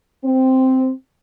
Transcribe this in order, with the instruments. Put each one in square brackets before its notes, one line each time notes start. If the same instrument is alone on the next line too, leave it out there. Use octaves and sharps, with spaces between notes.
[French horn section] C4